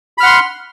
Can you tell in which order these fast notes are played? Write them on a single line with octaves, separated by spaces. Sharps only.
B5 F6 F#5 C6